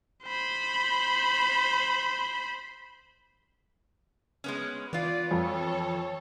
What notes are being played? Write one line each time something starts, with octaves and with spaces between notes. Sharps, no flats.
C5 B5
G#3 B3 C#4
E3 B3 F4 D5
F2 A4 C#5